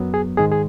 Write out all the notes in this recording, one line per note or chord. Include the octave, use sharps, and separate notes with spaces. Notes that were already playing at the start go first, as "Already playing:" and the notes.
Already playing: F#2 F#3 B3
G#4
G#2 D#3 G#3 G#4
G#4